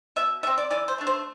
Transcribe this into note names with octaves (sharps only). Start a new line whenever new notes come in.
B2 E5
A3 E5
C4
D5
E3 D5
C5
A3 D4
C5